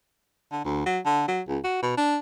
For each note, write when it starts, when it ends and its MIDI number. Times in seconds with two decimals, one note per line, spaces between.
0.52 0.61 50
0.65 0.83 38
0.86 0.99 54
1.06 1.26 50
1.28 1.41 54
1.48 1.59 37
1.64 1.79 66
1.82 1.94 47
1.97 2.18 62